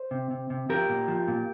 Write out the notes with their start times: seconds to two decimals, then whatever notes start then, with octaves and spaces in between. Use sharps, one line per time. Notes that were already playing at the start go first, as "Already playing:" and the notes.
Already playing: C5
0.11 C3
0.31 C3
0.50 C3
0.69 F3 G4 A#4
0.89 A#2
1.08 F3
1.28 A#2